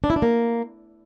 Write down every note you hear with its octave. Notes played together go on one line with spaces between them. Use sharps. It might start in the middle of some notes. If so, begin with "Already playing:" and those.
D4
E4
D4
A#3